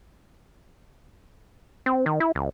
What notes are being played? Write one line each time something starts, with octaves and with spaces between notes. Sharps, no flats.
C4
D#3
E4
C#2